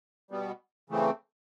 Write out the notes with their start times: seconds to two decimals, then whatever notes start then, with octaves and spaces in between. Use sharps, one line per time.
0.31 B2 G3 B3
0.90 C#3 E3 A3 C4